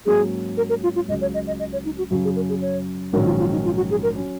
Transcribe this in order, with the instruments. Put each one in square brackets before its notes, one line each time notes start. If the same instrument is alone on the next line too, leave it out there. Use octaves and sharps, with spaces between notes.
[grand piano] G#2 F#3 A#3 C#4 [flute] G#4
[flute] A#4
A#4
F4
F4
[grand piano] C#2 C#3 F#3 [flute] D#5
[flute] C#5
D#5
D#5
D#5
C#5
D#4
F#4
[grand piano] F#2 C#3 F#3 [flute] F#4
[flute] G#4
A#4
G#4
C#5
[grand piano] A#1 G#2 D#3 F#3 C#4 [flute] A#4
[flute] F4
F4
D#4
F4
F#4
G#4
A#4
[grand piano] F#3 C#4